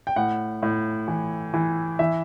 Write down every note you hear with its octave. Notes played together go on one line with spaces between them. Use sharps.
G5
A2 F#5
A2
E3
E3
E3 E5